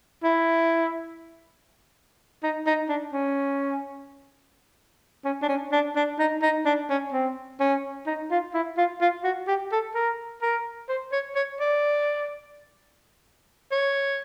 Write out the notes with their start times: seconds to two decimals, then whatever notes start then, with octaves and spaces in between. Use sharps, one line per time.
0.23 E4
2.43 D#4
2.67 D#4
2.89 D4
3.13 C#4
5.25 C#4
5.42 D4
5.48 C#4
5.72 D4
5.96 D4
6.19 D#4
6.42 D#4
6.66 D4
6.90 C#4
7.12 C4
7.60 C#4
8.07 D#4
8.31 F4
8.54 E4
8.77 F4
9.01 F4
9.24 F#4
9.47 G4
9.72 A4
9.95 A#4
10.42 A#4
10.89 C5
11.12 C#5
11.35 C#5
11.60 D5
13.71 C#5